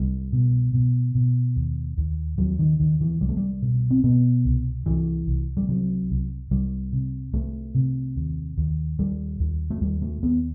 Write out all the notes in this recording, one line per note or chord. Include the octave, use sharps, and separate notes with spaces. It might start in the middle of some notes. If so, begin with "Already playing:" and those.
Already playing: C2 G3
B2
B2
B2
D#2
D#2
D#2 F#3
D#3
D#2 D#3
E3
C2 G3
A3
G3
B2
C4
B2 B3
C2
C2 E3
C2
G3
C3 F#3
C2
C2 G3
C3
C2 A3
C3
D#2
D#2
D#2 G3
D#2
A3
D#2 G3
A3
D#2 B3